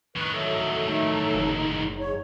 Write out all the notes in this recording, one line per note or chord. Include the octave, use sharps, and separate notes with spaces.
A2 D#3 B4 C#6
F#3 A4 E5
A3 D#4
F#1
G#2 C#5